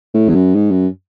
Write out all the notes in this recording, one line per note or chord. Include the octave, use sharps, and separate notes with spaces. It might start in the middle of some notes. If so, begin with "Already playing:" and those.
A2
E2
F#2
G#2
F#2